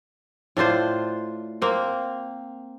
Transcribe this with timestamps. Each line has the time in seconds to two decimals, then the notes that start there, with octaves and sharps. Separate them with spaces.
0.57 A2 D4 F4 C5
1.62 A#3 C4